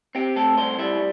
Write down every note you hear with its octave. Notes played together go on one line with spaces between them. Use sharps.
C4 G4
A3 A4
C2 C5
G3 E4